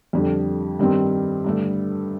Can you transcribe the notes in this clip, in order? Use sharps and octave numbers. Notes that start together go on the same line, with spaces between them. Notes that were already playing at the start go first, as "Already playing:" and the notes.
F2 D3 G3
G2 D#3 G3 C4
G2 D3 A3